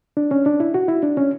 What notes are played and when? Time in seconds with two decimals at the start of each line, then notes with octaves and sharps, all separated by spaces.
0.17 D4
0.31 C#4
0.46 D4
0.60 E4
0.74 F#4
0.88 E4
1.03 D4
1.17 C#4